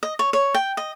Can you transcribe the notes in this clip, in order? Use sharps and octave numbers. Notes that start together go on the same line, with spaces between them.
D#5
C#5
C#5
G5
D#5